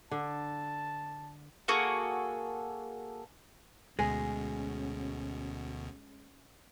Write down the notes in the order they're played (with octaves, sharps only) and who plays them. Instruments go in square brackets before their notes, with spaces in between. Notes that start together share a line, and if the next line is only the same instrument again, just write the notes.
[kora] D3 [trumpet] A5
[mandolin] A#3 F#4 G#4 A4
[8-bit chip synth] D2 B2 [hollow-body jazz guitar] G#3 [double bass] C#4 [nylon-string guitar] G#5